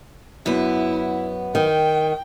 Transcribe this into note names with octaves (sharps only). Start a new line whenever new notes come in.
F#2 B3 E4
D#3 G5